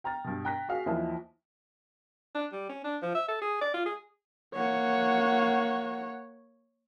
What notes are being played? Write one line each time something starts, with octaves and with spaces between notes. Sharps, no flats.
G5 A#5 F6 A6
G2 B2
G5 A#5 F#6 A#6 B6
F#4 G#4 F5
D#2 E3 F3 E4 D#5 A5
D4
G3
C#4
D4
F3
E5
A4
G#4
D5
F4
G#4
A#3 C#5 F#5